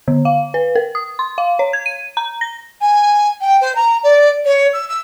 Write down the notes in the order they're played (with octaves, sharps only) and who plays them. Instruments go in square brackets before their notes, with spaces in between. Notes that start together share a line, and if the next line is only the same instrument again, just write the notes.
[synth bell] D3
F5
B4
A#4
D#6
C6
F5
C#5
G#6
D#7
A#5
A#6
[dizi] G#5
G5
C5
A#5
D5
C#5
E6
E6